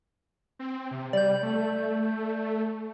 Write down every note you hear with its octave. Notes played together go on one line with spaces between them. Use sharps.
C4
C3
G3 D5 G6
A3